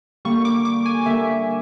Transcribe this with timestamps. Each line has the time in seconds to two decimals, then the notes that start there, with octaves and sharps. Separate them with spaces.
0.25 D3 G3 A#3 C#6
0.45 D6
0.65 D6
0.86 G#5
1.06 D3 G3 A#3 E5